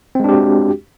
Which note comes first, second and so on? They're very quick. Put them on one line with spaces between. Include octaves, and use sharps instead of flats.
C4 G#3 D4 G4 F#4